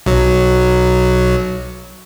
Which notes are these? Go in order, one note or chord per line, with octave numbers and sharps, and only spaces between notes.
B1 F#3